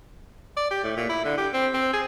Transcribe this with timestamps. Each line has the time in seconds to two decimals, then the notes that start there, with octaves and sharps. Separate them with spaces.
0.57 D5
0.71 G4
0.84 A2
0.97 A#2
1.10 E4
1.25 D3
1.38 G4
1.54 C4
1.74 C4
1.93 G#4